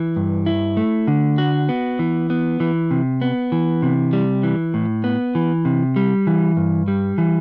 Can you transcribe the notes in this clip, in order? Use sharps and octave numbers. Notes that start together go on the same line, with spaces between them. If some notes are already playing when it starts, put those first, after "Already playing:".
Already playing: E3
G2
E4
A3
D3
F#4
B3
E3
B3
E3
C3
B3
E3
C3
G3
E3
A2
B3
E3
C3
G3
E3
G2
G3
E3